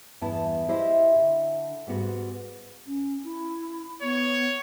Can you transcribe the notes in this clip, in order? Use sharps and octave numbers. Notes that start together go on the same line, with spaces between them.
E2 G2 B3 E4 A5
E4 G4 C5 D#5 E5
D3
G#2 G3 B3 F#4
C#4
E4
B3 C#5